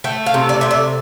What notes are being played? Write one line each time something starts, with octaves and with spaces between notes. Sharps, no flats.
A3 G5
F5
C3
D5
C3 E5
D5